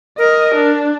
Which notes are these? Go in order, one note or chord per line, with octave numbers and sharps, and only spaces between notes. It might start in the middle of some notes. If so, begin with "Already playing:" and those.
A#4 D#5
D4